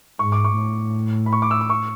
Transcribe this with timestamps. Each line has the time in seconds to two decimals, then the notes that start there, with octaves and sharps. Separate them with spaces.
0.19 G#2 C#6
0.32 D6
0.45 C#6
0.57 A2
1.26 B5
1.33 C#6
1.42 D6
1.51 E6
1.61 D6
1.70 C#6